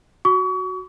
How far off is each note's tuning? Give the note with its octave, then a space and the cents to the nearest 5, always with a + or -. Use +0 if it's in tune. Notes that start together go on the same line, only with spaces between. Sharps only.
F#4 +0 C#6 +35